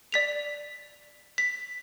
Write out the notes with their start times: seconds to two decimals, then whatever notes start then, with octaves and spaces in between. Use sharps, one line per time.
0.12 D5 B6 F7
1.38 B6